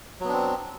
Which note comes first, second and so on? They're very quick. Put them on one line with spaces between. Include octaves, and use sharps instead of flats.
F#3 B3 D4 C4